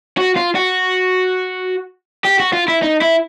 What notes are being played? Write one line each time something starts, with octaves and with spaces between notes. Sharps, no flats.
F#4
F4
F#4
G4
F#4
F4
E4
D#4
E4